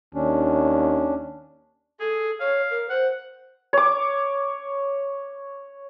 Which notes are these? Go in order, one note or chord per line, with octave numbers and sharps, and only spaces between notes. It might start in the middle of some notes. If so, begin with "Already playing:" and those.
D#2 C#4 D4
G#4 A4
C#5 F5
A#4
C5 F#5
C#5 D6